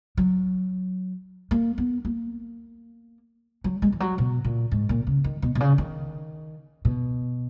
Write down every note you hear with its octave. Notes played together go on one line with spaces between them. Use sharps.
F#3
A#3
B3
A#3
F#3
G#3
E3
F#3
B2
A#2
G#2
A#2
C#3
D#3
B2
B2
C#3
D#3
B2